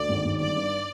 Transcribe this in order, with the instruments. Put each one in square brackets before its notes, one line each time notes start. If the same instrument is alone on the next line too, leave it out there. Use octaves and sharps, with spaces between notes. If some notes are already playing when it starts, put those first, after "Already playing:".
Already playing: [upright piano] D2 [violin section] D5
[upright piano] G#1
G#1
[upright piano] G1 [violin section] D5
[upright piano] G2